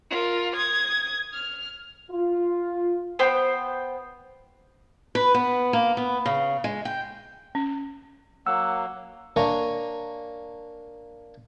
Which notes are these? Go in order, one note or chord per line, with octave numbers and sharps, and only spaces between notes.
F4 A#4
D#6 G#6
F6
F4
B3 C5 G5 F#6
B4
B3
A#3
B3
C#3
G#3
G5
C#4
F#3 A#3 F#5 E6
A#3 D4 C#5 G#5 A#5